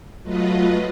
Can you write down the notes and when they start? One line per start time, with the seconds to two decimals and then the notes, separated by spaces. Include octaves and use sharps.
0.23 F#3 A3 F4 B4 D#5